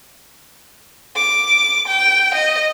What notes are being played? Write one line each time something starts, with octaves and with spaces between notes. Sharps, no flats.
D6
G5
D#5